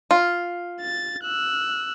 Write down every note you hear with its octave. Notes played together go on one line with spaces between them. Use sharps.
F4
A6
E6 F#6